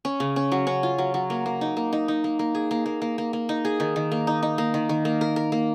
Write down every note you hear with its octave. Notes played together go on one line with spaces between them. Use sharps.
C#4
C#3
C#4
F#3
C#4
F4
F#3
F#3
A#3
A#3
D#4
A#3
D#4
D#4
A#3
A#3
G#4
A#3
A#3
A#3
A#3
A#3
D#4
G#4
D#3
D#3
A#3
D#4
D#4
A#3
D#3
D#3
A#3
A#4
A#4
A#3